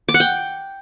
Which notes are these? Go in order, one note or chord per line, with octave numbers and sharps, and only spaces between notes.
D6
F#5
G5